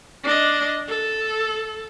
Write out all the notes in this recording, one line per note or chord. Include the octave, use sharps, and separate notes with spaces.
D4 D#5
A4